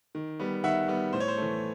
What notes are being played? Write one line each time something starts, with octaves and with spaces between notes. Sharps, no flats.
D#3
G3 B3
D#3 E5 F#5
G3 B3
A2 C5
C#5
C5
E3 A3